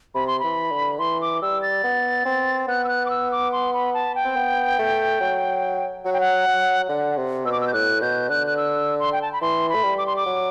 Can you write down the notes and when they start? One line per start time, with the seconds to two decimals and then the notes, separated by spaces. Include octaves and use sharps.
0.15 C3 B5
0.27 C6
0.39 E3 B5
0.71 D3
0.99 E3 C6
1.21 D6
1.42 G3 E6
1.62 A6
1.84 B3
2.25 C4
2.68 B3 F#6
2.84 E6
2.88 F#6
3.06 D6
3.10 E6
3.32 D6
3.52 C6
3.73 B5
3.94 A5
4.15 G5
4.25 C4
4.36 B3
4.79 A3
5.20 F#3
6.04 F#3 F#5
6.13 G5
6.20 F#5
6.47 F#3
6.89 D3 F#5
7.17 C3
7.45 B2 E6
7.52 D6
7.61 E6
7.67 G6
7.73 A2 F#6
8.01 B2 G6
8.29 D3 F#6
8.47 F#6
8.57 E6
9.00 C6
9.12 G5
9.22 A5
9.33 B5
9.41 E3 C6
9.69 B5
9.75 A3
9.83 G3
9.98 D6
10.06 C6
10.16 D6
10.26 F#3